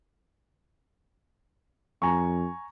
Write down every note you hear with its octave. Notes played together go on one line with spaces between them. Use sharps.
F2 G#5 A#5 C#6